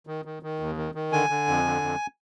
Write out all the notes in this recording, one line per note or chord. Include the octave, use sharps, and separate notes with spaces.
D#3
D#3
D#3
D#2
D#3
D#3
D3 G#5
D3
F2
D3
F2